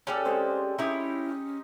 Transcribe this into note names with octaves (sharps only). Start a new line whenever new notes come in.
C#3 C#4 G4 A4 D5
G#3 C4 C5
C#4 D#4 E4 G4 C#5